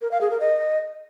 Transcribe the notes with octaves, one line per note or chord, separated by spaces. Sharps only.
A#4
F5
G#4
A#4
D#5